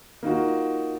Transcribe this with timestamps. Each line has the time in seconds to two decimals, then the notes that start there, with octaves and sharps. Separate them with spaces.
0.23 A#3 D#4 F4 F#4